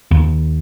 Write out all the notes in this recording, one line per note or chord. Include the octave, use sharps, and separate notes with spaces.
D#2